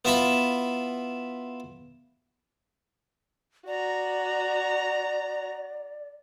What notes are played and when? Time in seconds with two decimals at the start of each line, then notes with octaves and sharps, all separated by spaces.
0.05 B3 E4 F4 E5 A5 B5
3.67 F#4 D5 A#5